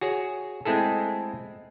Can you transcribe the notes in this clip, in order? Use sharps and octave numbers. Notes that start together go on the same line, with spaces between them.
F#4 G#4 C#5
G#3 A3 C4 E4 G#4 A4